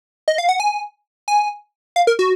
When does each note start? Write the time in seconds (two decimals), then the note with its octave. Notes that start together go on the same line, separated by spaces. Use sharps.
0.28 D#5
0.38 F5
0.49 F#5
0.60 G#5
1.28 G#5
1.96 F5
2.07 A#4
2.19 F#4